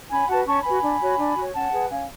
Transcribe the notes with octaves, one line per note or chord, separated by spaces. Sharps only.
C#4 G#5 B5
F#4 B4 F#5 A5
C#4 A5 C#6
F#4 B4 G#5 B5
D4
F#4 C#5
D4
F#4 C#5
C#4 F#5 A5
G#4 B4
C#4 F5 G#5